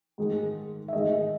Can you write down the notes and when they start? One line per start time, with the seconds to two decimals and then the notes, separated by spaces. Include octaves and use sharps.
0.18 G#2 D#3 G#3
0.88 E5
0.93 G#2 D#3 G#3 D#5